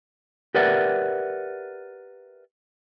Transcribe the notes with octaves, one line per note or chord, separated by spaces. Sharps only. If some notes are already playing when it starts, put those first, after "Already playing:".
G4 A#4 B4 D5 E5 F#5